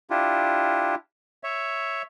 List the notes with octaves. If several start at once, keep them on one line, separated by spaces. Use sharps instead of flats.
D4 E4 F4 G4
C#5 E5